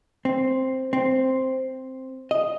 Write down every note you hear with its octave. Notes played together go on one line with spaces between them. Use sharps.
C4
C4
D#5